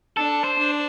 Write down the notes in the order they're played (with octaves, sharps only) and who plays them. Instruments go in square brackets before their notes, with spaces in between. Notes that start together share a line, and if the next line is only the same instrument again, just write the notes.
[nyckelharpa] D4 [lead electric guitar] A4
[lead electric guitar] C5
[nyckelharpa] D4